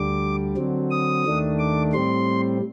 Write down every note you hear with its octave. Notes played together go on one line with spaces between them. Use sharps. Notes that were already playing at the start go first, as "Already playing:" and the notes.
Already playing: D2 D3 G3 D6
D3 F#3 C4
D#6
D#2 D#3 A3 D4
D6
A2 G3 C4 C6